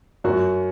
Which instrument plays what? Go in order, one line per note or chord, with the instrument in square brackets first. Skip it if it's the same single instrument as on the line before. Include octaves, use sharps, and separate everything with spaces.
[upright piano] F#2 F#4